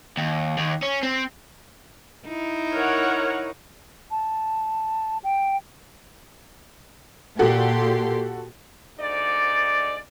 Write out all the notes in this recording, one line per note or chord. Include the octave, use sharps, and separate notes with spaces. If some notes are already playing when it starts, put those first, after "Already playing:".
D#2
D#2
C#4
C4
D#4 E4
A#4 C#5 F#5
A5
G5
A#2 F#4 G4 A4 C6
D2 G#2 D#4 D5